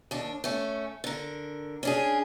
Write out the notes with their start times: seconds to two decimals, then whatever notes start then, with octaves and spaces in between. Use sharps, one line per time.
0.11 D#2 D4
0.44 A3 C#4
1.04 D3 A#4
1.83 C#4 D4 G#4